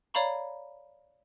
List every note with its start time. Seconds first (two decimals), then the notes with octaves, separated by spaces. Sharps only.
0.14 C#5 D5 F5 A#5 B5 C#6